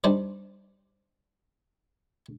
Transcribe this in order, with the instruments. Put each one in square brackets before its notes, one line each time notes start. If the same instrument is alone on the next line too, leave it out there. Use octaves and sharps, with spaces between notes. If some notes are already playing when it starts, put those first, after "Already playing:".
[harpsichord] G3 D4 D#4 C5 D5